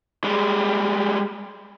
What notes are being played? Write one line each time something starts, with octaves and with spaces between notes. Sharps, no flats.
G3 G#3